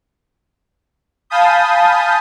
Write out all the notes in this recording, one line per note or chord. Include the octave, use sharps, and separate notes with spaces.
F5 G#5 A5 B5 D#6 G6